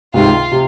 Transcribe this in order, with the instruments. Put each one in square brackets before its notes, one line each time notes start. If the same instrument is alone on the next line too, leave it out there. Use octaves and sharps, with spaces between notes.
[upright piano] C#2 C3 D#3 [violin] F4
[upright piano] C3